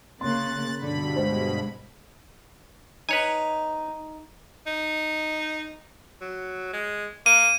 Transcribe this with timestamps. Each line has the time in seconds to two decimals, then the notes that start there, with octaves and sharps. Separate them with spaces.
0.21 C#3 A#3 C6 F#6 A6
0.79 G2 B2 D3 B5
1.16 G#3 C5
3.09 D#4 B4 C#5 G#5
4.67 D#4
6.21 F#3
6.73 G#3
7.26 A#3 D#7